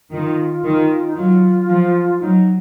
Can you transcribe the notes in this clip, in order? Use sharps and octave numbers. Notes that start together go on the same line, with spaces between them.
D#3 F4
D#3
D#4
F#3 F4
F3
F#3 D#4